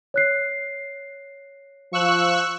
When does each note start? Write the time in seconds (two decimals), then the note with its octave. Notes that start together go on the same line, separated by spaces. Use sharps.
0.14 C#5 F#6 C7
1.93 F3 F5 C#6 E6 F#6